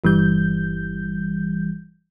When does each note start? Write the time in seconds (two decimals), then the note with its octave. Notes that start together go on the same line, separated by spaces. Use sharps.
0.04 G1 E3 G3 G6